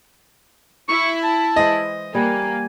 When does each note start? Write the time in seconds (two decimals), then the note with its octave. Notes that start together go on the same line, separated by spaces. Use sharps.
0.89 E4 C#6
1.23 A5
1.56 E3 G#3 C5 D#5
2.15 G3 A#3 F#5 G#5